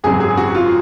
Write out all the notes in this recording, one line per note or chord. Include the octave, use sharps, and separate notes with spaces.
G#1 F#2 C#3 F#3 G#4
G#4
F#4
F4